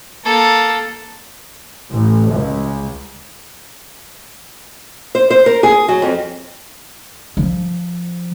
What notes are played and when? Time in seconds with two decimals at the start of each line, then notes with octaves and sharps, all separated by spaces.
0.25 A#3 A4
1.90 A1
2.33 C#2
5.15 C5
5.30 C5
5.46 A#4
5.63 G#4
5.88 F#3
6.02 F2
7.37 F3